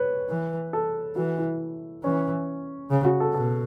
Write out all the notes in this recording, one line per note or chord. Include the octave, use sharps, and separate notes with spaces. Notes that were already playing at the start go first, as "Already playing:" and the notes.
Already playing: B4 C#5
E3
A4
E3 F#4
E4
E3 C#4
C#3
F#4
A4
B2 A4